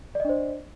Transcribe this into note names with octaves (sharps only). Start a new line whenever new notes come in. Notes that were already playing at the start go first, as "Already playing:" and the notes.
D4 C5 D5 D#5